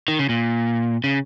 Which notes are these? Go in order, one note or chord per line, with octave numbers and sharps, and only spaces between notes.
D#3
C#3
A#2
C#3